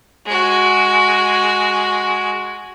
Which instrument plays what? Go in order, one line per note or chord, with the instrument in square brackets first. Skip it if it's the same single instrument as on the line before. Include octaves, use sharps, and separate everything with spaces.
[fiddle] G#3 F#4